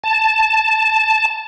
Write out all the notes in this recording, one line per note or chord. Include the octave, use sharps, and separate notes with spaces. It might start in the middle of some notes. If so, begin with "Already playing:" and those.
A5